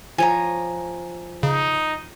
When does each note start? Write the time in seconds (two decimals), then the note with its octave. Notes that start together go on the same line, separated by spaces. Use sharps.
0.18 F3 C#5 G#5 A#5
1.43 C#3 D#4